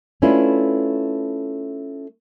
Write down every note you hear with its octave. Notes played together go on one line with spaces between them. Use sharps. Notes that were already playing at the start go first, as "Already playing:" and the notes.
A3 C#4 D4 E4 F4 B4